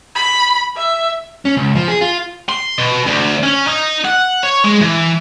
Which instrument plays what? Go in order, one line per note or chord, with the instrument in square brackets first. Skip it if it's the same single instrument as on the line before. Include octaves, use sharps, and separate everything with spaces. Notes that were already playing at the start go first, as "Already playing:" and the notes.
[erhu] B5
E5
[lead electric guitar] C#4
C#2
F3
G#4
F4
[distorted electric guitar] C6
B2
D2
C#4
D#4
F#5
C#5
G#3
E3